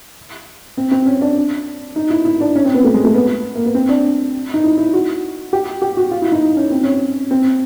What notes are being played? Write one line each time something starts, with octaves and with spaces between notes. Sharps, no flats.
C4
C4
C#4
D4
D#4
E4
E4
D4
C#4
C4
B3
A3
G#3
A3
B3
A#3
B3
C4
D4
D#4
E4
E4
F#4
G4
G4
F#4
F4
E4
D#4
C#4
C4
C#4
C4